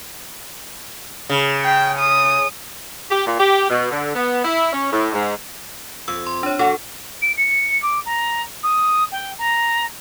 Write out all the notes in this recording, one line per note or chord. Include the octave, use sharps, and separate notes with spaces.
C#3
G5
D#6
G4
A#2
G4
B2
D3
B3
E4
C#4
A2
G#2
F2 E6
C6
D4 C#5
F#2 F#4 A4
D7
C#7
D6
A#5
D#6
G5
A#5